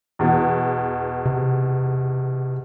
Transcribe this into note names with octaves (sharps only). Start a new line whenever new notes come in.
E2 B2
C3